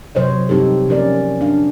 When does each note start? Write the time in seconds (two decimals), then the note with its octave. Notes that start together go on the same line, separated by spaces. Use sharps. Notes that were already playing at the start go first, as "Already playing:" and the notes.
0.15 C3 F#3 C5 C#5 D#5
0.49 G3 C4 D#4 G4 A4
0.88 F3 F#3 A#3 C#4 A#4 D5
1.41 D4 F5